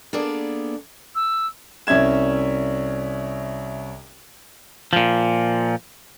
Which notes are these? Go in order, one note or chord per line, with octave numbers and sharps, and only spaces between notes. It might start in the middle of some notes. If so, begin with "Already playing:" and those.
A#3 B3 D4 G#4 A4 D5
E6
C2 C#4 E5 G#6 E7
A#2 F3